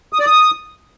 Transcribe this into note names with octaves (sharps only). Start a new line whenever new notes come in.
D#6
D5
D#6